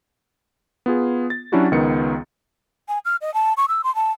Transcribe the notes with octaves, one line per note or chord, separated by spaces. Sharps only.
B3 F4 G#4
A6
F#3 C#4 D4 E4 F#4 G4
C#2 D#3 B3 C#7
G#5
F6
D#5
A5
C#6
E6
C6
A5